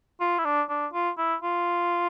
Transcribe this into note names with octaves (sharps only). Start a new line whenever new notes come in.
F4
E4
D4
D4
F4
E4
F4